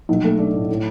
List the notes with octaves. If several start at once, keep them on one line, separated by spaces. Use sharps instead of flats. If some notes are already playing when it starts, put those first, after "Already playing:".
B1
A3
D4
A2
A2